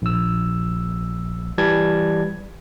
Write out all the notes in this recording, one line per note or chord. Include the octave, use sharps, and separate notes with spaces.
A#1 E6
E3 G3 A5 G#6